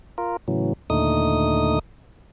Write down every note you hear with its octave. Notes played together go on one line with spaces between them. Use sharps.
F4 A#4
A2 C#3 E3 F#3
D#2 A#2 D3 A3 D#4 D#6